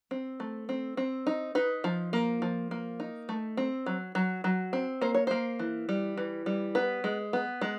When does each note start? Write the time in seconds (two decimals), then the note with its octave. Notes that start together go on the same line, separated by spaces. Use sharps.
0.11 C4
0.40 A3
0.69 C4
0.97 C4
1.27 D#4
1.55 D#4 B4
1.84 F3
2.13 A#3
2.42 F3
2.71 A#3
3.00 D#4
3.29 A3
3.57 C4
3.86 F#3
4.15 F#3
4.44 F#3
4.73 C4
5.01 A#3 C5
5.14 C#5
5.27 A#3 C5
5.59 E3
5.89 G3
6.17 E3
6.46 G3
6.75 B3 B4
7.04 G#3
7.33 B3
7.61 G#3